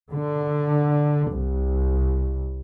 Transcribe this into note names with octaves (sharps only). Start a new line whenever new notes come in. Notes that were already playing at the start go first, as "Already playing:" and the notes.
D3
C2